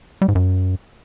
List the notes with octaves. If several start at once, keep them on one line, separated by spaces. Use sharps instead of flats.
G3
G#2
F#2